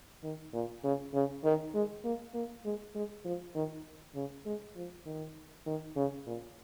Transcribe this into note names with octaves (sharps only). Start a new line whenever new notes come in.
D#3
A#2
C#3
C#3
D#3
G#3
A#3
A#3
G#3
G#3
F3
D#3
C#3
G#3
F3
D#3
D#3
C#3
A#2